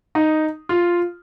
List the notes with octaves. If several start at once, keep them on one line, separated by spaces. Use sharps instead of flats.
D#4
F4